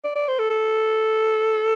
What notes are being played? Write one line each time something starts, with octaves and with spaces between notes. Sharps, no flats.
D5
D5
C5
A4
A4